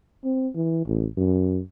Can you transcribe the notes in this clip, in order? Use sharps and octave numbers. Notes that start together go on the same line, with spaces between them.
C4
E3
A1
F#2